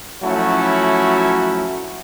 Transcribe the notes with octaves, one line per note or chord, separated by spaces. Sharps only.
F3 F#3 A3 C#4 E4 F#4